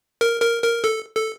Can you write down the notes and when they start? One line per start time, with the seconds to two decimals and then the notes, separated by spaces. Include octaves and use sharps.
0.21 A#4
0.42 A#4
0.63 A#4
0.84 A4
1.15 A4